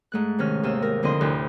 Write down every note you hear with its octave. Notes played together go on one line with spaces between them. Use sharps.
G#2 A3 F#6
C3 D#3 C#4 F6
D#2 C3 D#5 E6 F6
A#4
F2 D3 C4 E4 D#5 C6
D2 A2 C3 F#6